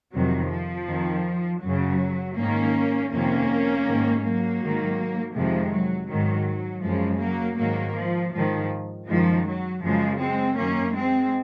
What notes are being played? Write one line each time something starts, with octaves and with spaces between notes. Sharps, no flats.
F2 C3 D#3 F#3
F3
F2 D#3
F#2 C#3 F#3
G#2 D#3 A#3 C#4
F2 C3 D#3 A#3 C#4
G#2 D#3
F#3 A#3
G#2 D#3
F2 C3 D#3 F3 G#3
F#3
G#2 D#3 F#3
F#2 C#3 F3 G#3
F#3 A#3
G#2 D#3 F#3 A#3
F3
G#2 D#3 F3
F#2 D#3 F3 G#3
F#3
F#2 C#3 F3 G#3
G#3 C4
F#2 D#3 A#3 C#4
G#3 C4